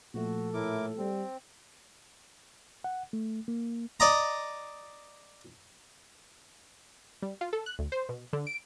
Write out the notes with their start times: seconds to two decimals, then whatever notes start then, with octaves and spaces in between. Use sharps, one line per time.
0.14 A#2 F3 A3 F#4 A4
0.54 A2 E4 A#4 D6
0.98 G3 C4
2.84 F#5
3.13 A3
3.48 A#3
4.00 D5 D#5 A#5
7.22 G3
7.41 F4
7.53 A4
7.66 F#6
7.79 D2
7.92 C5
8.09 B2
8.33 D3
8.47 D7